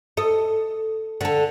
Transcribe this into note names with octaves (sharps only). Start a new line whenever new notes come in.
A4 D#5
D3 A4